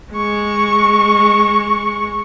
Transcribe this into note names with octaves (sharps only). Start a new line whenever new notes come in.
G#3 C#6